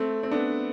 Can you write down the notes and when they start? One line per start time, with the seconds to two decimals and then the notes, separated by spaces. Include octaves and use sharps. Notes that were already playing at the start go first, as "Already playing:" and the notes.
Already playing: A3 C4
0.23 C4
0.32 B3 D4